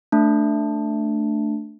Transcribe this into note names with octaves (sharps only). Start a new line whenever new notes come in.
A3 D4